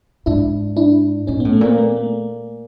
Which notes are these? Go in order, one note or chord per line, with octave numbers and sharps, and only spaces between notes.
G#2 D4 E4
D4 E4
A#2 C#4 D#4
B3 C#4
A2
A3 B3
A#2 A#3 C4
A3 B3
A#3
A3